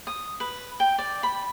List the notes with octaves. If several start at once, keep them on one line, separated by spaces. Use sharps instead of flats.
D#6
B4
G5
D5
B5